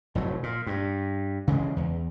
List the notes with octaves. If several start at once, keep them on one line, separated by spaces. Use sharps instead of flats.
F1 A2 F#3
A#2
G2
C#3 E3 G3 G#3
E2